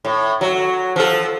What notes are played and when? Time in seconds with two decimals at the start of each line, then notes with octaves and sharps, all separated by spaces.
0.05 A2
0.41 F#3
0.96 F3 A4